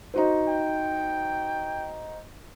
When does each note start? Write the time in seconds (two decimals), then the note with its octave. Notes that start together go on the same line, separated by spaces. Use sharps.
0.14 D#4 F#4 C5
0.48 G5